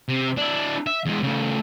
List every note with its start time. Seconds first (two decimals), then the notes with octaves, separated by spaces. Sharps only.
0.09 C3
0.37 D4 E4
0.87 E5
1.06 E2 G#3
1.23 C#3 A3